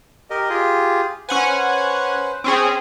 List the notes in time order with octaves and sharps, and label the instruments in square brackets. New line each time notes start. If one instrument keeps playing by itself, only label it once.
[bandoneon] G4 A#4 D#5
F4 G4 G#4
[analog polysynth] C#4 F#5 G#5 [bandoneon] B4 C5
[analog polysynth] C4 C#4 G#4